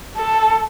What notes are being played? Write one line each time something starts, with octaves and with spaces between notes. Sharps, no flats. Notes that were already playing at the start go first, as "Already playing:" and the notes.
A4